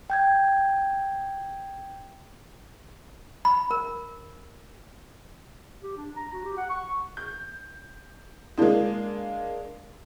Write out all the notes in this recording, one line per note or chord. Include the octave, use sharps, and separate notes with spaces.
G5 G6 G#6
B5
A#4
G4
D4
A#5
F#4
G4
F#5
C#6
G6
G#3 A#3 D4 E4 G#4